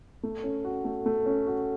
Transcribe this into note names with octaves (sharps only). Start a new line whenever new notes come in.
A3
C#4
F#4
A3
A3
C#4
F#4